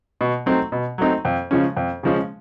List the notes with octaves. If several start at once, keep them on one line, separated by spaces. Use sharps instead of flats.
B2
F#3 A3 C4 D#4
B2
F#3 A3 C4 D#4
F2
C#3 F3 G#3 C#4
F2
C#3 F3 G#3 C#4